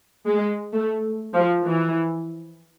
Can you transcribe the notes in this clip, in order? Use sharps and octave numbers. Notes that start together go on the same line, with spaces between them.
G#3
A3
F3
E3